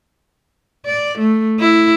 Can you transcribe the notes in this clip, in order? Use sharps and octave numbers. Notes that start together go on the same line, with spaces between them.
D5
A3
E4